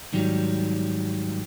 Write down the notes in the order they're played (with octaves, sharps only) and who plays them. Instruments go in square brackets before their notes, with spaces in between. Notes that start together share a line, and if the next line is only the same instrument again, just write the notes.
[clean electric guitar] G#2 D#3 F#3 G3